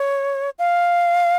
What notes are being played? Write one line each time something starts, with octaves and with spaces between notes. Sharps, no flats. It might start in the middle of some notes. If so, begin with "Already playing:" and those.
Already playing: C#5
F5